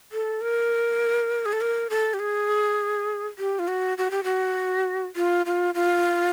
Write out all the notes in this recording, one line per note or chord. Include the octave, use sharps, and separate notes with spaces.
A4
A#4
G#4
A4
A#4
A4
G4
G#4
G4
F4
F#4
F#4
G4
F#4
F4
F4
F4